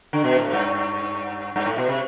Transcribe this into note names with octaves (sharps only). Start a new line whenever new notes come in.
D3
B2
A2
G2
G2
A2
B2
C3